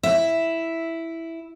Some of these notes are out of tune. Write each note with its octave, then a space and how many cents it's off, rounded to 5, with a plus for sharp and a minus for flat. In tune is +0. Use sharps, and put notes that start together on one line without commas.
E4 +0 E5 +0